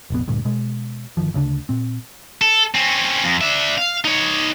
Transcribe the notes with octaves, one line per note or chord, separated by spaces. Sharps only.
F1 A#1 B3
D2 G2 A#2
B2 G#3
G1 C#2 D#3 F3
D2 C#3 A3 D4
A#2 C4
A4
C4 C#4
F2
D4 E5
F5
D#4 C#5